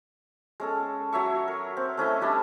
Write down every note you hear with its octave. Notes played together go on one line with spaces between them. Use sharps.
G#3 C#4 A4
F#3 C#5 E5 C#6
A#4
C4
A3 C#4 E4 D#5
G3 D4 A5 B5